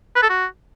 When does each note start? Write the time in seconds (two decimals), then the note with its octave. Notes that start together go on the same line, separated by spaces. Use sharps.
0.16 B4
0.23 A4
0.30 F#4